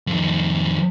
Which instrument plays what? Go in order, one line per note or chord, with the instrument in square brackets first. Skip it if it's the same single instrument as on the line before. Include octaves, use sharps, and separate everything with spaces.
[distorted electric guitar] F2 D#3